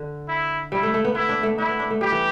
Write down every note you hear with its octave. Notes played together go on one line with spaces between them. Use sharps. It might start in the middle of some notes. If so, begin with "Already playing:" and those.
Already playing: D3
E4
G3 E4
A3
A3
B3
B3 E4
D4
A3
D4 E4
B3
D4
A3
G3 G4
E3